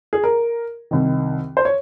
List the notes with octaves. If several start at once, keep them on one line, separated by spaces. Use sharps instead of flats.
G#4
A#4
C2 C3 D#3
C5
C#5